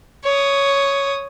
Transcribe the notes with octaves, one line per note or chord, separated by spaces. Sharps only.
C#5 D#6